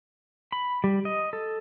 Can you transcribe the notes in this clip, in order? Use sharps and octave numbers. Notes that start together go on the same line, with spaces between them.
B5
G3
D#5
A4